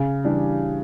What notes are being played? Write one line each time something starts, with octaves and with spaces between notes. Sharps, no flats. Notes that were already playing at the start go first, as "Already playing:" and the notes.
Already playing: C#3
E3 G3 D4 G4